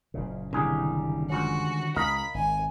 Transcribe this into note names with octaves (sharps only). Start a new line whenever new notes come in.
F#1 A#2 C#3
C2 D3 D#3 G3 G#4
C#2 C#4 F#4
C#2 A#4 D#5 F5 B5
G#1 G#5